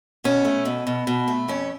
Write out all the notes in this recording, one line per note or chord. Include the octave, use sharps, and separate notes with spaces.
B2 C#4
A3
B2
B2
B2
A3
F2 C#4